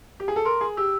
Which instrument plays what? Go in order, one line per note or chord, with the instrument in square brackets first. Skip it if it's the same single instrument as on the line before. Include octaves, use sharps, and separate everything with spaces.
[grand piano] G4
G#4
A4
[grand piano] A#4 [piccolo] C6
[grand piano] G#4
[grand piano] G4 [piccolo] E6